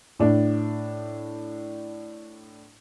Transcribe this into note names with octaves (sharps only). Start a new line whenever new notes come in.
A2 D4